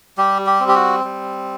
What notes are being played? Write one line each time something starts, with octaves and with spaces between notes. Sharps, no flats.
G3 G4
G4
C4
G4
F#4
G3